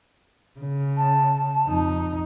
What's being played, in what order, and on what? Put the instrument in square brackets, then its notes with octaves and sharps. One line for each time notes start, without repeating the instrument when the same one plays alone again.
[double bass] C#3
[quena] A5
[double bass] F2 D#4